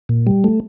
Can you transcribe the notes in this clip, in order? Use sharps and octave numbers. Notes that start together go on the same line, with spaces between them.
A#2
G3
A3